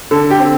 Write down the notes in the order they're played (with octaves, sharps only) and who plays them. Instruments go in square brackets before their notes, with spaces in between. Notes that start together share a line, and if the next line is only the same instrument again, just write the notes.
[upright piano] D3 A4
G4
C4